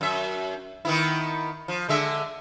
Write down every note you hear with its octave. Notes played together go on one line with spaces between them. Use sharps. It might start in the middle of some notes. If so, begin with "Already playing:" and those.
F#2 E5
D#3 B3 E4
F3
D3 G#3 E5